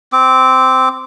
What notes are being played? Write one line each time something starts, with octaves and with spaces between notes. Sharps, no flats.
C4 D6